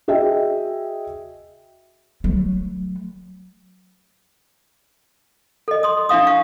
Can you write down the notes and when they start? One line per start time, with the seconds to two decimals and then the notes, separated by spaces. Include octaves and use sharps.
0.08 F#4 G#4 D#5 E5 G5
2.24 F#3 A3
5.68 A4 D#5
5.83 C6 D#6
6.09 D4 E4 E5 F5 D#6
6.27 F5 C#6